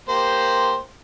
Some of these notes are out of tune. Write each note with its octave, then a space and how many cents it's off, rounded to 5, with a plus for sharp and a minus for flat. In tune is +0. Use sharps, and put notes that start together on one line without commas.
A#3 +0 G4 +0 C5 +0